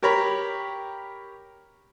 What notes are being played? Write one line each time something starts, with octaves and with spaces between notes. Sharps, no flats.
G4 A#4 C#5 A#5 B5